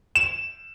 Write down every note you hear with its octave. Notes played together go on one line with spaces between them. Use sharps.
E7